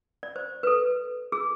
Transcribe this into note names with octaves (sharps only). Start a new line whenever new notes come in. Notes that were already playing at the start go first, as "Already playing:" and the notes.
D5
C5
B4
A4
G#4